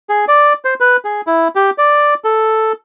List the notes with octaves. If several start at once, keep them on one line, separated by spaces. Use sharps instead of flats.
G#4
D5
C5
B4
G#4
E4
G4
D5
A4